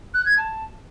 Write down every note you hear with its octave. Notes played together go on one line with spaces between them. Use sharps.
F#6
G#6
A5